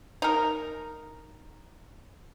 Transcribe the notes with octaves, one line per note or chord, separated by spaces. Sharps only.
D#4 A#4